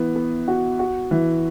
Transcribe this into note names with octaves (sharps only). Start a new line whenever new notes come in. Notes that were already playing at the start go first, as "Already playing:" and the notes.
Already playing: E3 B3
B3
F#4
F#4
E3